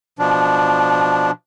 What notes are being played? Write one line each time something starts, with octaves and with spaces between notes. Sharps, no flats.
B2 F3 D4